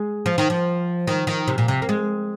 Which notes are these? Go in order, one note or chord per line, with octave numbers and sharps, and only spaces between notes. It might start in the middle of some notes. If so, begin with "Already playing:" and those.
Already playing: G#3
F3
D#3
F3
D#3
D#3
C3
A#2
C3
A#3
G#3